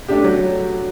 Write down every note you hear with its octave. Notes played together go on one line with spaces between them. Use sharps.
A3 D4 G4
F#3